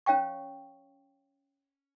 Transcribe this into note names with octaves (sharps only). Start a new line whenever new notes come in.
C#4 C#5 F5 G5 C#6